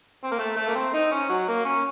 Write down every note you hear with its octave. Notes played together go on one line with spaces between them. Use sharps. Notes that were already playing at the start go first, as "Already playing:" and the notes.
C4
A#3
A3
A3
A#3
C4
D#4
C#4
F#3
A#3
C#4